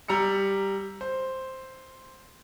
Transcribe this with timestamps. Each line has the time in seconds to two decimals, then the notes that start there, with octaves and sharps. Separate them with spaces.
0.08 G3 A#5 E6 C#7
1.01 C5